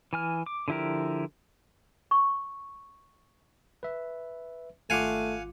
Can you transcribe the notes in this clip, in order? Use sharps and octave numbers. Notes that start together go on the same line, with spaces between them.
E3 G#5 F6
D6
D3 F3 E4 G4 A#4
C#6
B4 E5
G#1 A3 F4 F5 F#5 G#5 D6